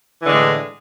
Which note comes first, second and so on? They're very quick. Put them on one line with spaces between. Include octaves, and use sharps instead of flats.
E3 D3 G#3 A2